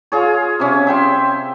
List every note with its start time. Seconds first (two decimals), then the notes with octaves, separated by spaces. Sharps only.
0.12 F4 G#4 C#5
0.60 C3 C#4
0.87 E5 G5 C6